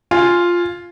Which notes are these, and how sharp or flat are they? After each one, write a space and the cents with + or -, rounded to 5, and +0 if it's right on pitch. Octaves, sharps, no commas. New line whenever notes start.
F4 +0 G#5 +0